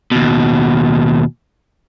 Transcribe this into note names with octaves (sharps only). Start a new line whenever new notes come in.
D#2 B2